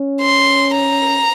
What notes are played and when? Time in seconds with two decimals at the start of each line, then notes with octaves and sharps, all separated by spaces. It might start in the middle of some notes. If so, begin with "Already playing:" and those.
Already playing: C#4
0.21 C6
0.74 A#5